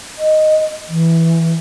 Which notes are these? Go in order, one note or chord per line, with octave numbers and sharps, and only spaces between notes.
D#5
E3